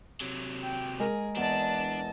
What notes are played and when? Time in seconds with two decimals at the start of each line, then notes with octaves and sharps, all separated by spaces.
0.21 C3 F#3
0.63 G5
0.99 G#3 G#4 A#4
1.37 E2 D4 D#5 A5